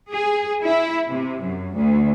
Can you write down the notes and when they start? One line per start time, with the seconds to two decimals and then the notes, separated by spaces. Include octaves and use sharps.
0.11 G#4
0.64 E4
1.09 C3
1.43 F#2
1.74 D2